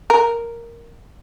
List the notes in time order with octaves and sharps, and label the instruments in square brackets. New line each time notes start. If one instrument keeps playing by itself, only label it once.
[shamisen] A#4